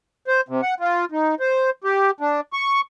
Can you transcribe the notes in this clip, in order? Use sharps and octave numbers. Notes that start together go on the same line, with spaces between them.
C5
C3
F#5
F4
D#4
C5
G4
D4
C#6